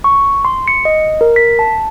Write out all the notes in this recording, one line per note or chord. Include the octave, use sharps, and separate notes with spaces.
C#6
C6
C#7
D#5
A#4
B6
A5